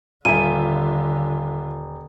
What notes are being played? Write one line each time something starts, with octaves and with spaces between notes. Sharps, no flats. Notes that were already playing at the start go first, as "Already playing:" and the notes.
D#1 D3 F4 E5 G#5 D#7